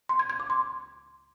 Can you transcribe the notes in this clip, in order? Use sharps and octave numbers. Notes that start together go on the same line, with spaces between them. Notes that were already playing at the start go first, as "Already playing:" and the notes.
C6
G#6
G#6
D6
C6